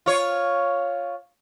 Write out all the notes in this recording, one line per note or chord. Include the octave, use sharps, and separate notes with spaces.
F4 C#5